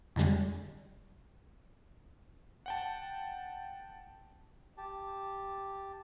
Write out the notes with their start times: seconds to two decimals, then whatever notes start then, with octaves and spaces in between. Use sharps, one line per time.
0.16 F2 D3 G3 G#3
2.66 F#5 G5 A5
4.78 G4 A5